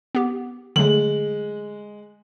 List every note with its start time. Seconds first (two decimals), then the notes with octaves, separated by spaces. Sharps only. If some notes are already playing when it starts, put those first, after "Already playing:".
0.15 B3 G4
0.76 D3 F#3 G#3 A3 F#7